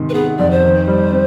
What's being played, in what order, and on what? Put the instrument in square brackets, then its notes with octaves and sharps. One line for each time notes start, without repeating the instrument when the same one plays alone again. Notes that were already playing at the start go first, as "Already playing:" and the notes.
Already playing: [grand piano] G#2 C3 D#3
[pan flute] B4
[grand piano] B3 [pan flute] G#4
[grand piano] F2 [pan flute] D5
[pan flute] C5
[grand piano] D#3
G3
C4